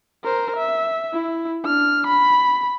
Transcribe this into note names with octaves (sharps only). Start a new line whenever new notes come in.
A#4 C5
E5
E4
D4 F6
B5